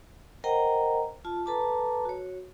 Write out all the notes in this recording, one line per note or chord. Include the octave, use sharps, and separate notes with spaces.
A#4 C5 D#5 F#5 G5 A#5
F4 A5
A4 B4 A5 A#5 D6
F#4 C#5